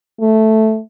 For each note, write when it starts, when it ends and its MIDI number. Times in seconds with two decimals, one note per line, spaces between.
0.21 0.80 57